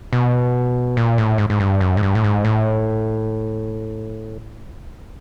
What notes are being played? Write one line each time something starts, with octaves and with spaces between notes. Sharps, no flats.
B2
A#2
A2
G#2
G#2
G2
F#2
G#2
G2
A2
G#2
A2